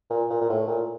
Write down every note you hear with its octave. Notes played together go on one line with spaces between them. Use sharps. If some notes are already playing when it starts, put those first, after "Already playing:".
A#2
A#2
A#2
A2
A#2